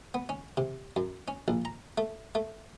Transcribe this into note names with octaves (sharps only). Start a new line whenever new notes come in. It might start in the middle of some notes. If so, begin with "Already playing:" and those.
B3
C#4
C3
F#2
C#4
A#1
A#5
A3
A3